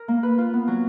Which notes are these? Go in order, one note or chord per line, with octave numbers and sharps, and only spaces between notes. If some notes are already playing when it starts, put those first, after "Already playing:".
Already playing: A#4
A#3
B4
F4
B3
F#3